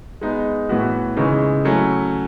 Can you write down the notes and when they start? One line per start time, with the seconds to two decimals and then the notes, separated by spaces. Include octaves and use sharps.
0.21 G#3 B3 D#4
0.69 A2 E3 B3 F#4
1.17 C#3 E3 G#3 D#4
1.65 F#3 A3 C#4 E4